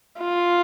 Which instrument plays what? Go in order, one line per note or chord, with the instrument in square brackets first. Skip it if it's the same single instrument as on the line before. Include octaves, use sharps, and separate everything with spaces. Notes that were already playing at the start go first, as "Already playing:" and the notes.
[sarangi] F4